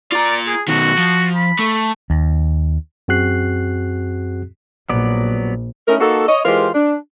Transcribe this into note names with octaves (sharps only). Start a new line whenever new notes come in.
F4 D5 A#5
G#4
B2 D#3 F#4
F3
B5
A3
D#2
F#2 C4 F#4 G#4 F#6 C7
A#1 F#3 B3 D5
A3 C#4 D#4 E4 A#4
A#3 D#4 F#4 A4
C#5 D#5
E3 G#3 F4 G4 A#4 C5
D4